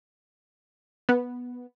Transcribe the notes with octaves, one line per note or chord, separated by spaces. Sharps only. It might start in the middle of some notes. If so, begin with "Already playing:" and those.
B3